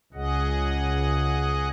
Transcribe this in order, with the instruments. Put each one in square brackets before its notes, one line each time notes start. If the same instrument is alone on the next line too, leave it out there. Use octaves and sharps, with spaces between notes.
[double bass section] C#2 [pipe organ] G#4 D#5 F#5